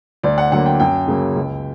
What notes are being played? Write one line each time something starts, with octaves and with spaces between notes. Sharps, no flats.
D2 D5
F#5
D3 F#3 A#3 F#5
G5
F#2 G5
C#3 F#3 A#3
C#2